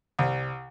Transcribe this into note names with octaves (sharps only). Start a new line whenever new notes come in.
C2